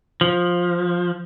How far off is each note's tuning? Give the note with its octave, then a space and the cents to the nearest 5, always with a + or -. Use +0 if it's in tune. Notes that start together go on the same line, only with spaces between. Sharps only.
F3 +10